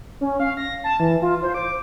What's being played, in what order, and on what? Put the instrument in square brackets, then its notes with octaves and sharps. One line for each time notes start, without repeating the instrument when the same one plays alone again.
[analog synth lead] C#4
F5
A#6
A5
E3
F4
C5
D6